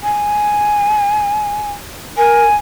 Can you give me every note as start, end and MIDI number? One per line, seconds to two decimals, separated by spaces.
0.03 1.71 80
2.17 2.45 70
2.17 2.56 80